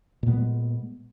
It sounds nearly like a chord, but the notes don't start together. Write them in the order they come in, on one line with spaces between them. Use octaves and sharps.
A#2 B3 G3 G#3